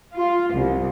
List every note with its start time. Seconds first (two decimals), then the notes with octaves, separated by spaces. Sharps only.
0.15 F4
0.55 C2